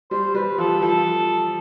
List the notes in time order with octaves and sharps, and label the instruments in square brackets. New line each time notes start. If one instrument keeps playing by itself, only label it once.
[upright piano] G3 [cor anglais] C5
[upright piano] G3 [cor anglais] B4
[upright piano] F3 [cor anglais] A4
[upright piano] F3 [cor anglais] A4